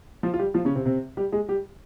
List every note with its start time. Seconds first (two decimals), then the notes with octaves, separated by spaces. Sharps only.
0.23 F3 F4
0.34 F4
0.39 G3 G4
0.54 F3 F4
0.65 C#3 C#4
0.75 C3 C4
0.85 C3 C4
1.17 G3 G4
1.32 G#3 G#4
1.48 G3 G4